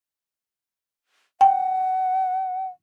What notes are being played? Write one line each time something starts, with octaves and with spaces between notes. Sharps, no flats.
F#5 G5